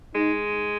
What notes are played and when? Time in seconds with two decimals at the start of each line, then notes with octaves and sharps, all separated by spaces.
0.15 G#3 D#4